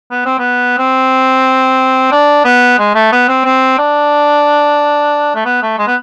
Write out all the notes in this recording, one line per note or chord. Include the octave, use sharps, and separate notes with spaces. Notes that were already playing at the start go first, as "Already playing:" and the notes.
B3
C4
B3
C4
D4
B3
G#3
A3
B3
C4
C4
D4
A3
B3
A3
G#3
B3